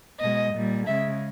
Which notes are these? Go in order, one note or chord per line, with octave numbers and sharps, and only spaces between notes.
B2 G#3 D#5
A#2 G3
C#3 G#3 E5